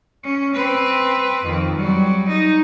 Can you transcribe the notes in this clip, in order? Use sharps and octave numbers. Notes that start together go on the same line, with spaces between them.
C#4
C4 B4
F2 D#3
F#3 G3
D#4